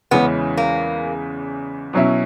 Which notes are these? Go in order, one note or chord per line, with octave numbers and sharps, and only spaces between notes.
E2 C#3 E3 G#3 B3 C#4
A#3
B2 F#3 C#4 E4